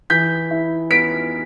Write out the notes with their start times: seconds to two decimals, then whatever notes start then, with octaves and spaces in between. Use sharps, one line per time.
0.10 E3 G6 B6
0.51 E4
0.90 B3 B6 D7